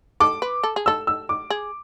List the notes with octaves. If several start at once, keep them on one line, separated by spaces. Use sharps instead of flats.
A4 D6
B4
A4
G#4
A4 E6
E6
D6
G#4